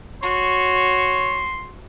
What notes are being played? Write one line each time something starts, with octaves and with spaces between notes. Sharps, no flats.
F#4 C#5 C6